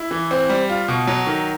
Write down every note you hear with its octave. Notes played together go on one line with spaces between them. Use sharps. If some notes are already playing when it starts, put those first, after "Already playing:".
Already playing: E4
E3
C4
G3
F4
B2
F#3
D#3